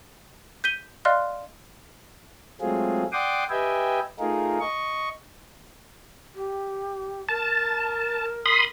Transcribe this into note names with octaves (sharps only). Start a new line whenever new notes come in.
G6 B6 D#7 G7
D5 D#5 F5 C6 F6 F#6
F#3 G#3 A3 C4 F4 G#4
D5 F#5 G5 C6 D6 D#6
G4 B4 D#5 E5 G5 G#5
A3 D#4 F4 G#4 A#4
D#5 C#6
G4
A#4 A5
B5 C6 D#6